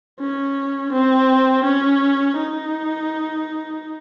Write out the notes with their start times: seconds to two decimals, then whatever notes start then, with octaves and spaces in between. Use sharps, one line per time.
0.20 C#4
0.92 C4
1.65 C#4
2.37 D#4